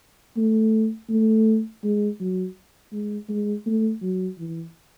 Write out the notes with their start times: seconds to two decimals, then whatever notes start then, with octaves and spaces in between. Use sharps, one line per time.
0.36 A3
1.09 A3
1.83 G#3
2.20 F#3
2.92 G#3
3.29 G#3
3.66 A3
4.02 F#3
4.38 E3